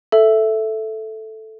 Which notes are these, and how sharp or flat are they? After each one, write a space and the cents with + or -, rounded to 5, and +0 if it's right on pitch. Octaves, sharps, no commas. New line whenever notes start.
A4 +0 E5 +0